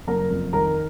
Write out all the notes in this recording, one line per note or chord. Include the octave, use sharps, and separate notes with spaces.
F#1 A#4 A#5
F2
D#3 A#4 A#5